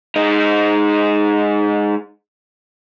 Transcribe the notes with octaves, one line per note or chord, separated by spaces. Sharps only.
G#3 D#4